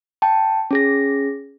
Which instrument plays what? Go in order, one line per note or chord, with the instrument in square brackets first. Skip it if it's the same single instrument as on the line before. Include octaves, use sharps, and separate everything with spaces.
[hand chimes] G5 A5
C#4 G#4 A#6